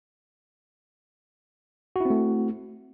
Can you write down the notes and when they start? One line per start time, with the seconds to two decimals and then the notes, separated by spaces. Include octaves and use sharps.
1.96 F#4
2.01 E4
2.05 C4
2.10 A3